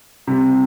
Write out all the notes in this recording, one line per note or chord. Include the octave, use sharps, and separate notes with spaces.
C3 G3 C4